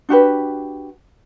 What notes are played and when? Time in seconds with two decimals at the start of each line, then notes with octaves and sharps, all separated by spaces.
0.09 D4 F#4 G4 B4